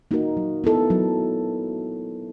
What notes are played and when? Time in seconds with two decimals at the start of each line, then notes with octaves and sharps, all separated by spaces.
0.11 A#3 D#4 F#4 A#4
0.37 F#3
0.64 B3 E4 A4
0.90 F#3